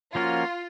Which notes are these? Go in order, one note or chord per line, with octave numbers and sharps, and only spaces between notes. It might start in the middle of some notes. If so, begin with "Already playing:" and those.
F3 A#3 C#4 F4 F#4 A#4